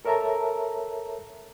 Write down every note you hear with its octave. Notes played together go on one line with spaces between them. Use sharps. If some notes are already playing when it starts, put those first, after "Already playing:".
A4 A#4 C#5 E5 A5 A#5